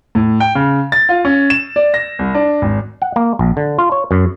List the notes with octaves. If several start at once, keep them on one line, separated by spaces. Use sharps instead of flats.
A2
G5
C#3
A6
F4
C#4
E7
D5
A#6
C2
D4
G#1
F#5
A#3
A#1
D3
F4
C#5
F#2